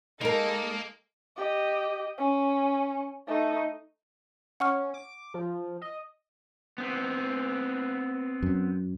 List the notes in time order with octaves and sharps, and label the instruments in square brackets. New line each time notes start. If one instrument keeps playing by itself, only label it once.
[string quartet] G#3 A4 D#5 [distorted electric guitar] A#3 [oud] D#4 A#4
[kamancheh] G4 D#5
C#4
A3 D#4
[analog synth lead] C#4 [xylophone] F#5 C#6 F6
[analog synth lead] D6
F3
D#5
[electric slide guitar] B3 C4
[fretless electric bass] F#2